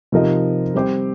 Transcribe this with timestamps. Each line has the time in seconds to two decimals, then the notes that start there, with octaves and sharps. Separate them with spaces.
0.12 C3 F3 D#4 A#4 D#5
0.74 G3 C4 G4 C5